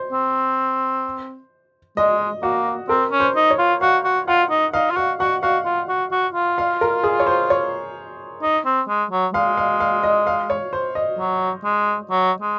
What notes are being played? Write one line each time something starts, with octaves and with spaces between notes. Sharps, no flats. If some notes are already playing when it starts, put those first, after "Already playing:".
Already playing: C5
C4
G#3 D#5
A#3 F#4
C4 A#4
C#4
C5
D#4
C#5
F4
F#4 F5
F#4
F4 F#5
D#4
D#4 F5
F4
F#4 F5
F#4 F#5
F#4 F5
F4
F#4
F#4
F4
F5
A#4
G#4
C#5
C5
C#5
D#4
C4
G#3
F#3
G#3 F5
F5
F5
D#5
F5
C#5
C5
D#5
F#3
G#3
F#3
G#3